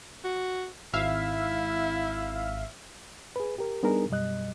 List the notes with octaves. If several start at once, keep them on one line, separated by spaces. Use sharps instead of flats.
F#4
G#1 E4 E5 F5
G#4 B4
G4 A#4
G3 B3 D4 D#4 G#4 A#4
F#2 B2 G3 D#5 F#6